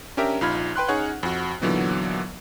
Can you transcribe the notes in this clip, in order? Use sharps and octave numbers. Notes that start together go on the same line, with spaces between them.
C#4 D4 G4 A#4 E5 A#5
A#1 D#4 F4 B5 F6 G#6
B4 G5 C6 F#6
C#4 D#4 G#4 C#5 F#5
F2 F#4
A#2 D3 E3 F#3 B3 D#4